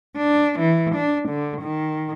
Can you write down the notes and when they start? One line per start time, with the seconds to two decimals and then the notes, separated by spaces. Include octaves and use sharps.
0.17 D4
0.59 E3
0.95 D4
1.29 D3
1.62 D#3